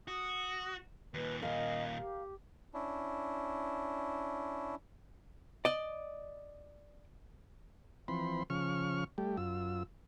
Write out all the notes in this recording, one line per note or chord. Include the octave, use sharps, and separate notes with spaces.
F#4 D#6
D#2 A#2 B4
A#4 D#5 F5
G4
C#4 D4 E4
D5 D#5
E3 F3 C4 B5 C6
C#3 F3 C#6 F6
G3 A3 G4
F#2 F4 E6